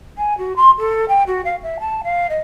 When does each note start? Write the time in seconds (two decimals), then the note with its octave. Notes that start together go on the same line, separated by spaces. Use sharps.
0.17 G#5
0.37 F#4
0.56 C6
0.78 A4
1.08 G5
1.26 F#4
1.44 F5
1.63 E5
1.79 A5
2.03 F5
2.29 D#5